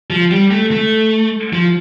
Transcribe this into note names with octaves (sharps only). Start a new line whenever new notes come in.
F3
G3
A3
A3
F3